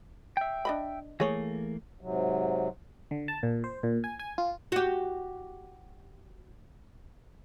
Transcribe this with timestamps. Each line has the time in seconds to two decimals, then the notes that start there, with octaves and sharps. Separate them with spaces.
0.37 E5 G5
0.65 D4 D#5 B5
1.20 E3 A3 A#3 G#4 C#5
2.01 G#2 C3 F#3
3.11 D3
3.28 A5
3.43 A#2
3.64 C5
3.83 A#2
4.04 G#5
4.19 G#5
4.38 F4
4.72 F#4 G4